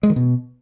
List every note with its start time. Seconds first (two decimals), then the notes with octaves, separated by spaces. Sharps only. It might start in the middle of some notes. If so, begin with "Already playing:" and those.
0.03 G#3
0.10 D#3
0.16 B2